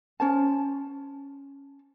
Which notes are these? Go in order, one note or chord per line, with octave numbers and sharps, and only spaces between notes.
C#4 C5 A5